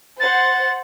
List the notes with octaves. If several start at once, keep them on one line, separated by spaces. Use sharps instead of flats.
C5 F#5 A6